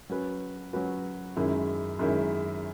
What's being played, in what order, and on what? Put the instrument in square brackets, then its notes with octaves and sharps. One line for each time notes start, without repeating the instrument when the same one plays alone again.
[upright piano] F#3 C#4 F#4 B4
F#3 C#4 F#4 B4
F#2 D#3 G#3 C#4 E4
F#2 D#3 G#3 C#4 E4